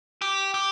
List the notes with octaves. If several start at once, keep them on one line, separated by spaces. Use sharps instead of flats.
G4
G4